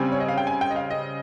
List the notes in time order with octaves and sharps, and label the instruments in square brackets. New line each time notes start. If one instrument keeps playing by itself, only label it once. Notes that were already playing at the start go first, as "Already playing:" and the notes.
Already playing: [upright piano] C#3 G3 C4 G#5
C#5
D#5
F5
G5
G#5
G5
D#5
F5
D#5